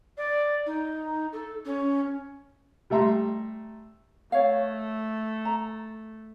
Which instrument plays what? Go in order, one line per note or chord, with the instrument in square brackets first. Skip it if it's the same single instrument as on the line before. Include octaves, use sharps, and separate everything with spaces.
[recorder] D5
D#4
A4
C#4
[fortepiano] G3 A3 E5 A#5 C6
[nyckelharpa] A3 [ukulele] C#5 F5
[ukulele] A#5